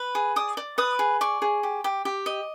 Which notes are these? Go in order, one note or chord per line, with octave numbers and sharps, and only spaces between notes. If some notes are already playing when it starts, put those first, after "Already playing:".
Already playing: B4
G#4
D5 D#6
D5
B4 D#6
G#4
D5 C#6
G#4
G4
G4
G4
D#5